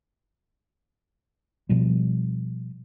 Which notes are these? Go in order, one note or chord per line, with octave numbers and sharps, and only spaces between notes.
B2 F3 G3